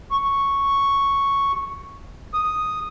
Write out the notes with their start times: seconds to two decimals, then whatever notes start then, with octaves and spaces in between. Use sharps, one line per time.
0.11 C#6
2.34 D#6